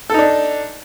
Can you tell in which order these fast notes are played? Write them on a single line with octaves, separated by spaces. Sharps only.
A4 D#4 D4